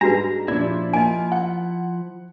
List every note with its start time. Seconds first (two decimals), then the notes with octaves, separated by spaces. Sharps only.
0.01 G#2 G3 G#3 D4 F#4 B4 A#5
0.48 A#2 F3 D4 E4 D5
0.93 A#3 D#5 G#5
1.32 F#5